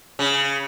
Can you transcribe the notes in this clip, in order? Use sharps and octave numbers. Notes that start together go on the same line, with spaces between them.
C#3